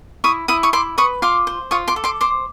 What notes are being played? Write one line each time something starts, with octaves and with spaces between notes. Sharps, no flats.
E4 C#6 D#6
E4 D#6
C#6 D#6
E4 C6 D6
B4 C#6 D#6
F4 C6 D6
C5
F4 C#6 D#6
C6 D6
A4
C6 D6
C5 C6 D6